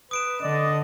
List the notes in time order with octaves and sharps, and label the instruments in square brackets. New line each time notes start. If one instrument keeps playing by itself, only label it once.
[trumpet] B4 [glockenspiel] D#6 D7 E7
[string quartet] D3 [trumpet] D5 [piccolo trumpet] D#5